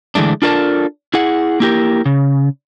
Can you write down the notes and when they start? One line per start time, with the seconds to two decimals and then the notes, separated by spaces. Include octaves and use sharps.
0.15 D3 E3 G#3 A3 D4
0.42 D4 F4 A4 A#4 D5 A5
1.14 E4 G#4 F#5
1.60 A#3 E4 G4 A#4
2.06 C#3